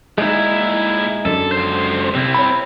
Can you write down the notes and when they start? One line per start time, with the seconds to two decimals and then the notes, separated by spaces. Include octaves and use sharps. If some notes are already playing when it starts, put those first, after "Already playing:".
0.18 A#2 G#3 D#4 E4
1.25 F#2 D3 A4
1.52 C#2 C5
2.15 C3 C4 E4
2.34 C#5 B5